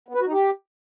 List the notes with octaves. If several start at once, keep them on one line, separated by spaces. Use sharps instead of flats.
B3
B4
F#4
D#4
G4